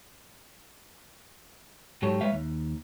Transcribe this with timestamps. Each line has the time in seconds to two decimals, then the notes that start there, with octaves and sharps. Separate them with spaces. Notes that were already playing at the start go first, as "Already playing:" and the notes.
2.02 G#2 F#3 G4 A4 C#5
2.21 G#3 B4 C#5 E5 F5
2.32 D#2